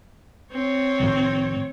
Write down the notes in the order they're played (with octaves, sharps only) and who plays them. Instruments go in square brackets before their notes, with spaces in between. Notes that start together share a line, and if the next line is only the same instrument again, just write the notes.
[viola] C4 C#5
[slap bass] A2 D#3 F3